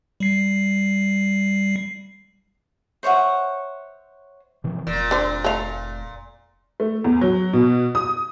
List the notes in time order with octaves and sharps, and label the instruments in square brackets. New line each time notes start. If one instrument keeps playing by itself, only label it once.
[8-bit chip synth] G3 C7
[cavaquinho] C5 C#5 E5 F#5
[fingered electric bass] C3 E3 F3
[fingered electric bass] F1 [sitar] A#2
[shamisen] D3 C5
A3 F5
[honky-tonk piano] A3
E2
F#3
B2
D#6